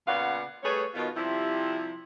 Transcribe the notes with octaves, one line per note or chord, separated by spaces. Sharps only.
A#2 C#3 B3 D5 F5 F#5
G3 A3 G#4 B4 C#5
B2 D#3 F4
C3 F3 G3 E4